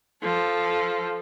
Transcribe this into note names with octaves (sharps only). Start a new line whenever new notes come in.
F3 A4